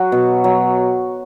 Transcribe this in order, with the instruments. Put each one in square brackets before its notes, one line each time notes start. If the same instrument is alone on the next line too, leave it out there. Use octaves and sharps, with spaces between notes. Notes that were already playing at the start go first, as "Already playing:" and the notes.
Already playing: [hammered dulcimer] F#3 F#4
B2
F#3